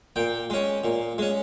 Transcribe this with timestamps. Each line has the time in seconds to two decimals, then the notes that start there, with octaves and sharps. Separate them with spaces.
0.16 A#2 G5
0.50 G#3 C#4
0.84 A#2
1.18 G#3 C#4